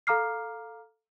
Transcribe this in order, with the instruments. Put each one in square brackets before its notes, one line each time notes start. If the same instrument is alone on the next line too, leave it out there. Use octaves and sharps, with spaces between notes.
[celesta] A4 F5 A#5 D6 F6 C7